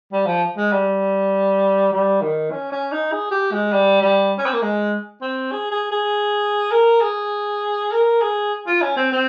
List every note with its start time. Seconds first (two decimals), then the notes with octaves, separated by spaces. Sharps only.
0.12 G3
0.26 F3
0.57 G#3
0.72 G3
1.92 G3
2.21 D#3
2.52 C#4
2.72 C#4
2.92 D#4
3.12 G#4
3.31 G4
3.52 G#3
3.72 G3
4.01 G3
4.38 C#4
4.46 C4
4.53 A#3
4.62 G#3
5.22 C4
5.52 G#4
5.71 G#4
5.91 G#4
6.71 A#4
7.01 G#4
7.92 A#4
8.22 G#4
8.67 F4
8.82 C#4
8.97 C4
9.12 C4